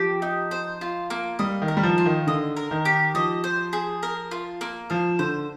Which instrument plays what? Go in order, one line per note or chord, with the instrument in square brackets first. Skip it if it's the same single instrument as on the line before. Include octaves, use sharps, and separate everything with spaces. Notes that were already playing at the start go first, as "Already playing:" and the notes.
Already playing: [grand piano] F3 [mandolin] G4
[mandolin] D#4
C5
F4
A#3
[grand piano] G3 [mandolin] D#5
[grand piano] D#3
[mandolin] A#4
[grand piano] G3
F3
[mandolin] F4
[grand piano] D#3
[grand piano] D3 [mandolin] D#5
[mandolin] A#4
[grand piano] D#3
[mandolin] G4
[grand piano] F3 [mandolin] D#5
[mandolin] C5
G#4
A#4
F4
A#3
[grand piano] F3 [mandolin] F5
[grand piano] D3 [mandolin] C5